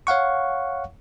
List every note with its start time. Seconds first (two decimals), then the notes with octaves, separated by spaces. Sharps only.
0.07 C#5 F5 F#5 C#6